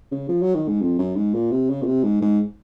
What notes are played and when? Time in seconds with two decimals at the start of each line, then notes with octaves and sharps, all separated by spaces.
0.11 C#3
0.29 F3
0.42 F#3
0.55 D#3
0.68 G#2
0.82 F2
0.99 F#2
1.16 G#2
1.34 A#2
1.52 C3
1.69 C#3
1.82 A#2
1.86 C3
2.04 G#2
2.21 G#2